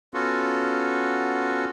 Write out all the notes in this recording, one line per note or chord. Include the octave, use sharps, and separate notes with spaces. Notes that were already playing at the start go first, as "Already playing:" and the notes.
B3 C#4 F4 F#4 A4